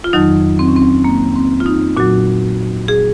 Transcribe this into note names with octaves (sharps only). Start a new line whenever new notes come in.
F4
F2 D#3 F#3 D#4
C4
C#4
C4
A#3
C4
F4
D#4
A#2 F#3 F#4
G#4